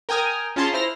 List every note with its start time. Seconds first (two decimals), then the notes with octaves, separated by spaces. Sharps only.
0.09 A#4 G5 G#5 D#6 F6
0.56 C#4 F4 G#4 A5 A#5 C6
0.73 E4 C5 F6 A#6